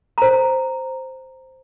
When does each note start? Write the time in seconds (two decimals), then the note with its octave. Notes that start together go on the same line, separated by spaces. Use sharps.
0.18 C5 A#5